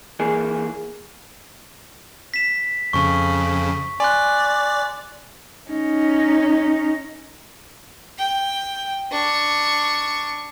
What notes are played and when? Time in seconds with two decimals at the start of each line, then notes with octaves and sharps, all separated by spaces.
0.20 E3 A#3 G#4
2.34 B6 E7
2.93 F2 C#3 C#6
4.00 D5 G#5 C6 F#6
5.70 C#4 D#4
8.18 G5
9.11 D4 C#6